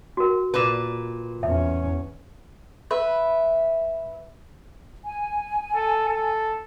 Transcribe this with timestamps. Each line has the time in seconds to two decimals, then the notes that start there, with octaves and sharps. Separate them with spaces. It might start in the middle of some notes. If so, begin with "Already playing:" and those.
0.17 F#4 A#4
0.54 A#2 B4
1.43 E2 C#4 E5
2.91 B4 E5
5.04 G#5
5.75 A4
6.08 A4